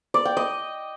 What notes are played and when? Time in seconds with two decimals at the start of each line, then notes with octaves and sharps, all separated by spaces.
0.14 D5
0.25 G5
0.37 D#5